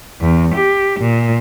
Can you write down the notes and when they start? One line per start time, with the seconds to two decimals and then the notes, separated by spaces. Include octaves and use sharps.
0.21 E2
0.55 G4
1.00 A#2